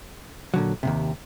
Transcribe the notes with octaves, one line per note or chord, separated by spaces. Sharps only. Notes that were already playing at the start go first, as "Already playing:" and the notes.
A#2 D3 F#3
D#2 G#2 C3